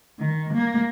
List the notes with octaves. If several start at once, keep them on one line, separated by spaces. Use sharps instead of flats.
D#3
A#3